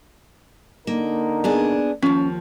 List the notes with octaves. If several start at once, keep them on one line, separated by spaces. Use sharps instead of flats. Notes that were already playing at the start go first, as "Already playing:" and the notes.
D3 A#3 D#4 A#4
B3 D4 G#4
D#2 F3 C#4